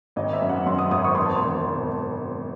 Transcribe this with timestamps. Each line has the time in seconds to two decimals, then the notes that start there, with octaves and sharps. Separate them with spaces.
0.16 G#1 D#5
0.33 E5
0.42 F#2
0.49 F#5
0.66 F#2 C6
0.78 D#6
0.91 G#1 D#6
1.04 C#6
1.15 E1 C6
1.26 A5
1.36 C6
1.42 E1
1.67 E1